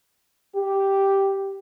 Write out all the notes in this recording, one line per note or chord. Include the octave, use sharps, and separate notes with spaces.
G4